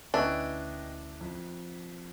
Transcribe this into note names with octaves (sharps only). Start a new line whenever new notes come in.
D2 C#4 D4 E4 B4 D#5 G5 F#6
F2